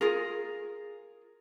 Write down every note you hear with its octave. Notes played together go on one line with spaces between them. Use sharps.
F4 G#4 A#4